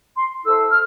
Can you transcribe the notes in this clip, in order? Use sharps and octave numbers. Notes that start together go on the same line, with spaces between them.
C6
E4 A4 C5 E6
F6